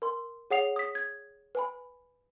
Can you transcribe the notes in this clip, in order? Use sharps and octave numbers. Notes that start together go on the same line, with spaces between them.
A#4 C6
G#4 C#5 F#5 D#6 C7 F7
D#6 B6
G#6
B4 G#5 B5